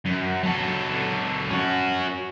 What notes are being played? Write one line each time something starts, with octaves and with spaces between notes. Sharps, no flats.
F#2
F#3 A4
C#4 F#4